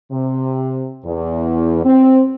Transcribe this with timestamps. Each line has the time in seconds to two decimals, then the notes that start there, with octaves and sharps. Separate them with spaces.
0.12 C3
1.05 E2
1.85 C4